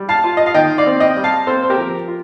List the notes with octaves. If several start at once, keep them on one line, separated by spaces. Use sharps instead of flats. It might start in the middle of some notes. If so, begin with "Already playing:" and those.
Already playing: G3
F5 A5
F4
D#5
F5
D#3 D#5 G5
D5 F5
C4
D#5 G5
G3
F5 A5
C4 A4 C5
C5
G4 A#4
F3
F4